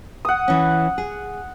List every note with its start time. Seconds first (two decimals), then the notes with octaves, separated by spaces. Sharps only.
0.25 F#5 D#6
0.48 E3 C#4
0.98 G#4